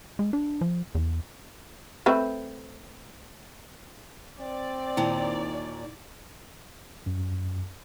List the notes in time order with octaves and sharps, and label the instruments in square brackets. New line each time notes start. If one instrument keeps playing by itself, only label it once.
[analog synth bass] G#3
D4
F3
E2
[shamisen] A3 C4 B4
[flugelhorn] C4 [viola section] D5
[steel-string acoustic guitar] D#2 A#2 D#3 [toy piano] D#4 E4 G5
[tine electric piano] F#2